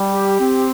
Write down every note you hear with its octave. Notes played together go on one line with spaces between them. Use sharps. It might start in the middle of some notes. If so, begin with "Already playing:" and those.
Already playing: G3
G4
C4